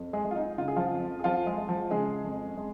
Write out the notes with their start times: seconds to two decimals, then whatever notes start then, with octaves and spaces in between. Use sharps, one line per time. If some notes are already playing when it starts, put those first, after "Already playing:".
Already playing: F2
0.13 G#3 G#4
0.25 G#3
0.31 F4
0.36 D#4
0.58 C#3 F4
0.68 G#4
0.76 F3 F4
0.91 F2
1.19 G#4
1.24 F2 F3 F4
1.46 G#3 G#4
1.58 G#3
1.69 F3 F4
1.91 C#3 G#3 G#4
2.25 F2
2.58 G#3